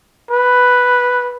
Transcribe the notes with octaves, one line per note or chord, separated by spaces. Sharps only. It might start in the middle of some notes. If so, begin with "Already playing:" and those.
B4